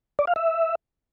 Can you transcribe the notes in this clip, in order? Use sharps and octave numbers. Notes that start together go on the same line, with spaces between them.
D5
F5
E5